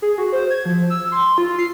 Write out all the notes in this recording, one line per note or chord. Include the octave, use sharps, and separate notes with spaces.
G#4
F#4
C5
G#6
F3
E6
C6
F4
C7